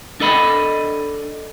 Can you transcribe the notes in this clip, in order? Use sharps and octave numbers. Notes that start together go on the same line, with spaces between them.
D4 A4 D#5 B5